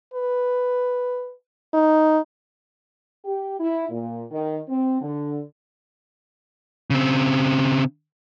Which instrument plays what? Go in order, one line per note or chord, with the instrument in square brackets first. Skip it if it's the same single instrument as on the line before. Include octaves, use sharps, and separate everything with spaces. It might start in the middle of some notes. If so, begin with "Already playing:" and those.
[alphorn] B4
D#4
[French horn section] G4
E4
A#2
D#3
C4
D3
[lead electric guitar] C#3 C4